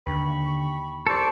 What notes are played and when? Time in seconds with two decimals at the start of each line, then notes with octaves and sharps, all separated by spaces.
0.07 D#2 D3 G5 B5 C#6
1.07 C2 A4 C5 D5 C#6